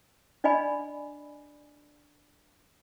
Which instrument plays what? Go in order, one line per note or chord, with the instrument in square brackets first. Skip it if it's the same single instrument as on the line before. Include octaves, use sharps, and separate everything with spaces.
[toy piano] D4 D5 D#5 G#5 B5